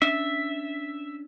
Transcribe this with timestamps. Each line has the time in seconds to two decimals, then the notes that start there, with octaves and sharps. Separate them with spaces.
0.02 C#4 D4 E5